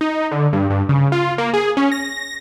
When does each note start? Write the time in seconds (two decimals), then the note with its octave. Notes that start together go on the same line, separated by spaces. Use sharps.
0.01 D#4
0.31 D3
0.53 G2
0.70 G2
0.89 C#3
1.12 F4
1.38 A#3
1.54 G#4
1.77 C#4
1.92 A#6